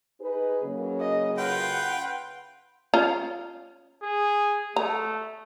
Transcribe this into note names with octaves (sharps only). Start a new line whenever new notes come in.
D#4 G#4 B4
C#3 F#3 A#3
D#5
F4 B4 F#5 G5
C#4 F4 A#5
G#4
A3 A#5